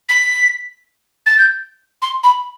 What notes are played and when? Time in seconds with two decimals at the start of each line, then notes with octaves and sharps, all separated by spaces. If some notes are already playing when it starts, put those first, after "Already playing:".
0.09 B6
1.26 A6
1.38 G6
2.02 C6
2.24 B5